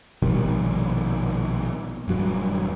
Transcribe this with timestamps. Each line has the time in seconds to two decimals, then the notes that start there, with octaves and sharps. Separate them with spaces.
0.22 A#1 B2 D#3 G3
2.08 D#1 G2 F#3